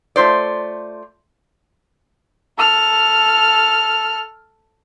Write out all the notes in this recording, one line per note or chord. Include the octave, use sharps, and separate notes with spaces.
A3 F4 C5 D5
A4 F6